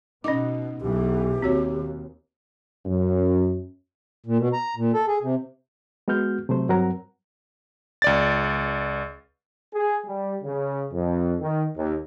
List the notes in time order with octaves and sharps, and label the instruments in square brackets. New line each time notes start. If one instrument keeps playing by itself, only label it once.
[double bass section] B2 [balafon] C#4 D6 [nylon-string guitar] D#4 D#5
[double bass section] B1 B2 E3 [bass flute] G4
[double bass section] D#2 [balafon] C4 F#4 C#5
[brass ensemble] F#2
[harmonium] A#2
B2
A#5
A#2
A4
G#4
C3
[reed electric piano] G#3 B3 F#4 F6 G6
C3 F#3 A3 C5
G2 F#3 C4 A#4 F#5 A#5
[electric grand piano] C#2 D5 A6
[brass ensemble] G#4
G3
C#3
F2
D#3
D#2